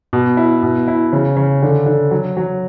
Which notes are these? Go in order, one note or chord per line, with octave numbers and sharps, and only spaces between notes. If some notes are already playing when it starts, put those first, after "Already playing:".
B2
E4
B2
E4
C#3
C#3
D3
D3
F#3
F#3